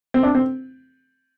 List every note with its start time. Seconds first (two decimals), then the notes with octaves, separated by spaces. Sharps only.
0.14 C4
0.23 D4
0.35 C4